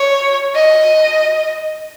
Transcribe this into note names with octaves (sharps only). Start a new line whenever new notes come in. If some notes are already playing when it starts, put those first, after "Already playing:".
Already playing: C#5
D#5